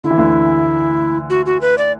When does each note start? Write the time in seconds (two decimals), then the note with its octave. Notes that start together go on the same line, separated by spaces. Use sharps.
0.04 D3 E4
0.11 E3
0.18 D2 D3
1.30 F#4
1.46 F#4
1.61 B4
1.78 D5